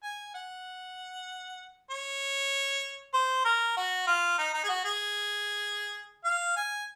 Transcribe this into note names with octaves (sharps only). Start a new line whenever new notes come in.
G#5
F#5
C#5
C5
A#4
F#4
F4
D#4
D#4
G#4
F#4
G#4
F5
G#5